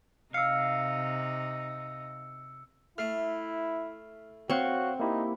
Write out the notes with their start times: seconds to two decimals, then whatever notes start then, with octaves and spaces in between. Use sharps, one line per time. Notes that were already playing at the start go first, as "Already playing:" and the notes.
0.34 C3 D#4 F5 E6 C#7
2.98 A3 E4 F6 C7
4.50 C4 F#4 C#5 F5 C#6 F#6
5.00 A#3 D#4 E4 G4